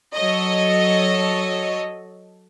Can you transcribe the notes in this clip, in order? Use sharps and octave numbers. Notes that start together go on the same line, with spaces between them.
F#3 A4 C#5 D#5